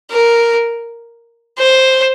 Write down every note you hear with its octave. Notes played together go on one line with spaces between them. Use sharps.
A#4
C5